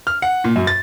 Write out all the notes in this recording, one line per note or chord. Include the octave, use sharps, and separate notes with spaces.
F6
F#5
A#2
F#2
A6